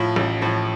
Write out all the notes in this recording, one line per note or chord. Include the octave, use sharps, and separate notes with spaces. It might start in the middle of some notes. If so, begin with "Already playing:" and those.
Already playing: A2 F3 F4
A1
A2 F3